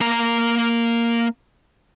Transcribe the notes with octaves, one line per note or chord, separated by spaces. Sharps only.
A#3 A#5